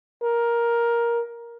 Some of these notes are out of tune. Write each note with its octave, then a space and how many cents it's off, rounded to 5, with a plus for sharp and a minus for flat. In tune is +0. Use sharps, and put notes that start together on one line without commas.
A#4 +10